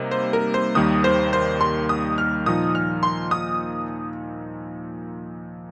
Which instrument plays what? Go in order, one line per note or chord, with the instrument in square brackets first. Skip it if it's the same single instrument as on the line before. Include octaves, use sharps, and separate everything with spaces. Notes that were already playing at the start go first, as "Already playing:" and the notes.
Already playing: [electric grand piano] C3 G3 A#3 D#4
[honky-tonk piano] C5
A#4
C5
[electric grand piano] D#2 D#3 G3 A#3 [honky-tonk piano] D#6
[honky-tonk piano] C5
C5
C6
D#6
F6
[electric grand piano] A#2 F3 D#4 [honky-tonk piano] D#6
[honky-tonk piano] F6
C6
D#6